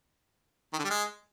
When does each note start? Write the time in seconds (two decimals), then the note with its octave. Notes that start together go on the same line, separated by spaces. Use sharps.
0.73 D#3
0.78 D3
0.84 G3
0.90 G#3